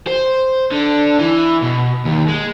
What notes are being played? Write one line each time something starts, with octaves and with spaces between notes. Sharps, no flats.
C5
D3
E3
B2
D#2
G#3